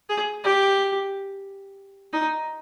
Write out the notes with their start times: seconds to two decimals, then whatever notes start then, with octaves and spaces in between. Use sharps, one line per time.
0.09 G#4
0.44 G4
2.13 D#4